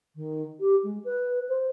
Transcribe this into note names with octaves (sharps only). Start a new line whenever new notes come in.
D#3
G4
G#3
B4
C5